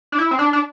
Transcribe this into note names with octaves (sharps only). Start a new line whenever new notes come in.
D4
E4
C4
D4
D4